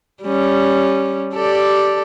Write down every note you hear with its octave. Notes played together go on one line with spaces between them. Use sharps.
G3 C#4
G4 A4 D5